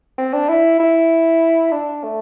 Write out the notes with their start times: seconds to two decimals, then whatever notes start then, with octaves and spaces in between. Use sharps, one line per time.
0.18 C4
0.33 D4
0.49 E4
0.80 E4
1.72 D4
2.04 A3